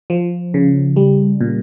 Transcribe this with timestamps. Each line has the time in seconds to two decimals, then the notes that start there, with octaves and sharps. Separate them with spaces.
0.10 F3
0.54 C#3
0.96 G3
1.41 A#2